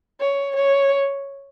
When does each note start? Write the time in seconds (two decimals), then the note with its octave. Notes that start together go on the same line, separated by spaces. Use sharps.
0.20 C#5
0.56 C#5